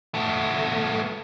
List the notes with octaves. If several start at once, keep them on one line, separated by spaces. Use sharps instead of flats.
A3 B3